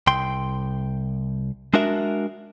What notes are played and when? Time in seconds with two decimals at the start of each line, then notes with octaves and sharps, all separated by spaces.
0.07 C2 G5 C6
1.74 G#3 D4 F#4 A#4 E5